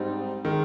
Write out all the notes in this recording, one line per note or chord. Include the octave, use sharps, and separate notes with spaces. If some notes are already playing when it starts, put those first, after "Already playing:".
Already playing: G#2 G3 C4 D#4
D#3 G#3